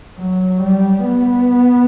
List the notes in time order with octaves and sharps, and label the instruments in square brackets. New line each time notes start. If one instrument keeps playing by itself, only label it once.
[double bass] F#3
G3
B3